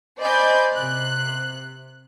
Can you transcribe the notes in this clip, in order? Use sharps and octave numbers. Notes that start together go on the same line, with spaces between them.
C5 D5 D#5 G#5 B5 G6
C3 F#6